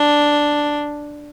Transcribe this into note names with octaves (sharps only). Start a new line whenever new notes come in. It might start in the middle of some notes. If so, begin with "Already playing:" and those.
Already playing: D4